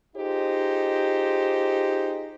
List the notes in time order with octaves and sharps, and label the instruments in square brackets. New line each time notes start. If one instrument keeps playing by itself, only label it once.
[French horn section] D#4 F4 G4 G#4 C5